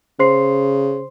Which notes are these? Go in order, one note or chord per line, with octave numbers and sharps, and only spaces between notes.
C#3 C5 C6 C7